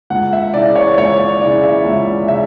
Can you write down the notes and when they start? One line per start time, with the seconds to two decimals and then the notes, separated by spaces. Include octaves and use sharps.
0.10 C#2 F#5
0.33 E5
0.54 C#3 E3 D5
0.75 C#5
0.97 C#2 C#5
1.19 D5
1.41 C#3 E3 D5
1.63 E5
1.84 C#2
2.28 C#3 E5